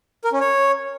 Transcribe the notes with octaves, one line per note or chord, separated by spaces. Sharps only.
A#4
C#4
C#5